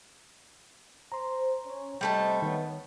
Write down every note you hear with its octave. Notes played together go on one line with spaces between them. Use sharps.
C5 A#5 C6
C#4 C#5
C3 G3 A3 D#5 A5
D#3 B3 C#5